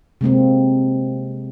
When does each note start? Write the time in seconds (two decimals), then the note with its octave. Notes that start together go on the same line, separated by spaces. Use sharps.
0.21 C3 G#3 A#3 C4